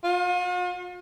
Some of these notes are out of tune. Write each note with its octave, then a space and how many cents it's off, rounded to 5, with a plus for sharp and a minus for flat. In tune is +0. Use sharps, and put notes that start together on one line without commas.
F4 +45